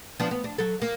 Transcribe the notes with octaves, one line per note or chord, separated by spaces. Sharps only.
F3 B3 D4
B3
D4
F#3 A4
A#3